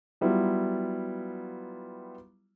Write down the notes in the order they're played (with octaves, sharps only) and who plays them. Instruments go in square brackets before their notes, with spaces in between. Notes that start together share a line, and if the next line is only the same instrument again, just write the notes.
[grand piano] F#3 G3 B3 E4 F4